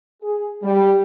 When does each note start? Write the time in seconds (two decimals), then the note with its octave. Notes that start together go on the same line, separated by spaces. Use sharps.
0.23 G#4
0.63 G3